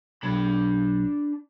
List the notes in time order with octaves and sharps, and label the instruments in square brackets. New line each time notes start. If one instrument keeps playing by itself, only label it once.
[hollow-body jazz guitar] B1 [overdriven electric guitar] D4 B5